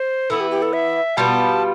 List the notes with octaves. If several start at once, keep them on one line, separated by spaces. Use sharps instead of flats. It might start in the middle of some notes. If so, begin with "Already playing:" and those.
Already playing: C5
E3 B3 E4 A4
G4
G4
A4
E5
B2 G3 B3 F4 A5